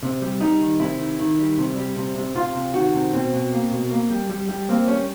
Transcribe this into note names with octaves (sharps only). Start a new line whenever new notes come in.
C3
G3
G3 D#4
D#3
C3 E4
D#3
D#3
G3
C3
G3
C3
C3
C3 F4
C3
D#3 F#4
C3
B2 C4
B2
A#3
B2
A#3
G3
G3
G3
A#3 C4
G3 C#4